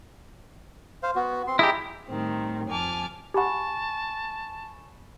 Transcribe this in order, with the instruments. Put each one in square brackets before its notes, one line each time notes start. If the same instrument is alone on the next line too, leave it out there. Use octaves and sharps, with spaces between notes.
[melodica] C5 F5
B3 F#4
C4 C6
[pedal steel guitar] E4 G4 [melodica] G#4 D#5 A#5
[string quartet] A2 D#3 G3 C4
F2 G#5 A5 D6 F6
[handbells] G4 F#5 [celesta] G#5 B5 C#6 [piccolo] A5